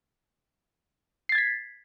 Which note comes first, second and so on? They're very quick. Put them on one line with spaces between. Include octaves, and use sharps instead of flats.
C7 A6 G#6 B6